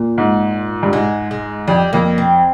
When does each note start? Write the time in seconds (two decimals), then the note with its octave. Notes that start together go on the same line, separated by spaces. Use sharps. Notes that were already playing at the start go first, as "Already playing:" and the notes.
Already playing: A#2
0.18 G#2
0.83 G2
0.93 G#2 G#3
1.31 G#3
1.68 F2 G3
1.93 F2 A#3
2.18 C4